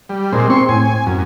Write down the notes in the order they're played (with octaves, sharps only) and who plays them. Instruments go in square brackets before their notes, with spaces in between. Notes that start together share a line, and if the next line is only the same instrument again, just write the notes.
[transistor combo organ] G3
A#2 G#3 C4
[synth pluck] C4 [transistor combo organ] C6 C#6
[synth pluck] A2 [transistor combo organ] G#5
[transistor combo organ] F#2